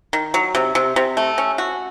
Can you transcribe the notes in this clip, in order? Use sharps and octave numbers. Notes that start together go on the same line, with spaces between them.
D#3
F#3
C3
C3
C3
A3
C#4
F#4